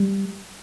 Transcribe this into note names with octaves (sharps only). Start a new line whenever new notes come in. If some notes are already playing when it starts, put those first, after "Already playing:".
Already playing: G3